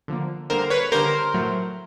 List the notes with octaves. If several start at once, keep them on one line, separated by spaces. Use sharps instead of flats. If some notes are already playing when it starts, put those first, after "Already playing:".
D3 F3 A#3
D3 G3 A#3 A#4 C5
B4 C#5
D3 G3 A#3 A#4 C5
A2 F#3 A3